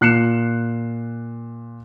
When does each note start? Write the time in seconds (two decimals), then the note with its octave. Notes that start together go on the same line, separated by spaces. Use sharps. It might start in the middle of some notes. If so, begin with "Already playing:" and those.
0.01 A#2 F#6 C7 C#7 E7